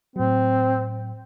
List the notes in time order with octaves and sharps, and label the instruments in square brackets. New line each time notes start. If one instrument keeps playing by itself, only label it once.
[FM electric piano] A2 F#3 [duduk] C4